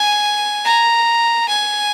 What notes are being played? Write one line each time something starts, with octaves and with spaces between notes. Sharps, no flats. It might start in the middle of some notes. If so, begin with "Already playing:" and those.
Already playing: G#5
A#5
G#5